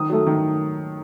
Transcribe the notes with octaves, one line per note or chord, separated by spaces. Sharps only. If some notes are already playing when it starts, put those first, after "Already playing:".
Already playing: D#3 D#6
F#3 A3
D#3